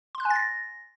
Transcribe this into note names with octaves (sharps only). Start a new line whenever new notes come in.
C6
F#6
G#5
A6
A#6